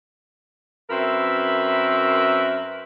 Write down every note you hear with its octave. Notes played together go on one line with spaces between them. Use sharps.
F#2 C4 A#4 B4 E5